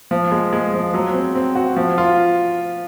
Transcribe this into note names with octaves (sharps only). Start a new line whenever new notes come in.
F3
G#3
G#3
F3
F#3
C4
C4
F#4
F3
F4